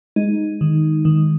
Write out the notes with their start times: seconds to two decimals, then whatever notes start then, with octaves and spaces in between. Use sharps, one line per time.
0.16 G#3 D#4
0.61 D#3
1.05 D#3